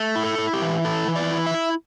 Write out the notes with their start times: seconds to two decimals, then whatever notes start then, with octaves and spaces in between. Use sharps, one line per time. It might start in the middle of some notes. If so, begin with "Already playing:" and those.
Already playing: A3
0.16 E4
0.24 A4
0.38 E4
0.53 G4
0.62 E3
0.85 E4 A4
1.08 E3
1.16 D5
1.31 E4
1.46 E5
1.54 E4